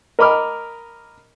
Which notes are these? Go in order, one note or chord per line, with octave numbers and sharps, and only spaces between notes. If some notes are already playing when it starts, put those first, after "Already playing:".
A#4 D#5 B5 D6 F6